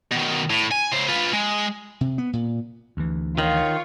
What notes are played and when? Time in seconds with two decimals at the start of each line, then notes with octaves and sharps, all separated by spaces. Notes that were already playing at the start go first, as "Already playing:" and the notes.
0.12 B2 D#3
0.50 A2
0.72 G#5
0.92 C#3 C5
1.09 F4 B4
1.33 G#3
2.01 C3
2.18 B3
2.33 A#2
2.97 D2 E3
3.38 D#3 F4 C#5